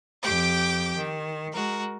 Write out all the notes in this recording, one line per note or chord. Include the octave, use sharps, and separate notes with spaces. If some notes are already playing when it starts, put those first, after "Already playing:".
F2 G4 G5 D6
D#3
G#3 F#4 A#4